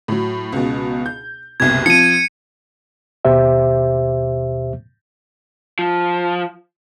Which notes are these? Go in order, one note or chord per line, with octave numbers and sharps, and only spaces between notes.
A2 F#3
C#2 B2
G6
F#1 C2 B2 G#6
F3 C4 C#7 D#7
D#2 B2 G4 C5 E5
F3